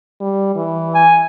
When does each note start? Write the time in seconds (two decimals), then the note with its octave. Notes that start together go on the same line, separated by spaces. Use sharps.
0.21 G3
0.56 E3
0.95 G#5